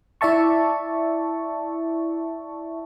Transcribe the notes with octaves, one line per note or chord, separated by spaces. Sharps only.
E4 D5 E5 A5 C#6